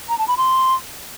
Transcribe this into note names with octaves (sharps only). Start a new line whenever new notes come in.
A#5
A5
B5
C6